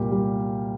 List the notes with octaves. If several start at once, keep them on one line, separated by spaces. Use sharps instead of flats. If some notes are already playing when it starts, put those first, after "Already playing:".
Already playing: C2 A#2 G3 A#3 G4
G3